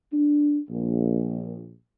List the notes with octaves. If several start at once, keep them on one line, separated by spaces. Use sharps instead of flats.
D4
A#1